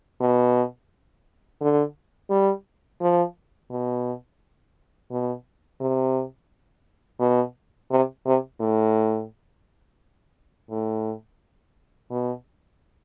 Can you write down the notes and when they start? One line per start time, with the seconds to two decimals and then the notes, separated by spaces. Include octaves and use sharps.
0.20 B2
1.61 D3
2.30 G3
3.01 F3
3.70 B2
5.11 B2
5.80 C3
7.20 B2
7.91 C3
8.26 C3
8.61 A2
10.70 A2
12.10 B2